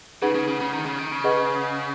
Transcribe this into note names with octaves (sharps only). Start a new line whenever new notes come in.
C#3 D#4 G#4 B4 F#5
C#3
C#3
C#3
D#3
C#3
D#3
C#3
G#4 B4 D#5 F#5 C#6